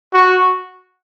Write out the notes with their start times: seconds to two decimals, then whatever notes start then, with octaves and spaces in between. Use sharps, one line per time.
0.13 F#4